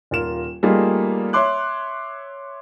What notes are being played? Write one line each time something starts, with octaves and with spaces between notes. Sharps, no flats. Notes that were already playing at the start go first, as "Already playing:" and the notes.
D#1 F4 A#4 E7
G3 A3 A#3 D#4 F4 G#4
C#5 E5 C6 D6 F#6